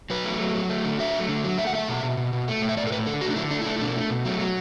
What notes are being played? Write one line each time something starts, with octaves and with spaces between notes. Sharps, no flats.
F#3 B4
A3
F#3
F#3
A3
D3
F#3 E5
A3
D3
F#3
A3 E5
F#5
A3 E5
B2
B2
B2
B2
A3
A2
E5
A2 D5
A4
A2 B4
D3 A4
A3 F#4
D4
D3 E4
A3 D4
E4
A3 D4
E4
B2 D4
A3
B2
F#3 A3
F#3